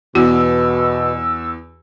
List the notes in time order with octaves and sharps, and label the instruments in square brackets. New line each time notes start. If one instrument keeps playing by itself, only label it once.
[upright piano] E2 [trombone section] B2 [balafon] F#4 [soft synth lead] E6